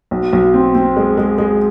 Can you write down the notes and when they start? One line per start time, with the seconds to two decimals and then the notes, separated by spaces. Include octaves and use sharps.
0.11 B1
0.33 B1
0.54 C4
0.75 C4
0.96 G#3
1.18 G#3
1.38 G#3